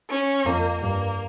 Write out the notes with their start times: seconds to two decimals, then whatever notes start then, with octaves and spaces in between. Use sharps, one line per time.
0.10 C#4
0.46 F2 A#3
0.81 G2 A#3